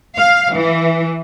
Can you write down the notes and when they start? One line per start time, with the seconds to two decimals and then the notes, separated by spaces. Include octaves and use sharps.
0.15 F5
0.54 E3